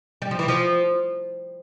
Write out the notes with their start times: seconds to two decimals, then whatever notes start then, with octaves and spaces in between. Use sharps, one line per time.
0.22 G3
0.31 F3
0.39 E3
0.48 F3